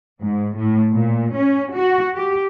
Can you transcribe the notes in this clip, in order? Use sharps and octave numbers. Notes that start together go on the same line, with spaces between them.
G#2
A2
A#2
C#4
F#4
G4